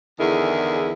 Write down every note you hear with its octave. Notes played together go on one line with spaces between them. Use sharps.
E2 D3 D#3 E4 G#4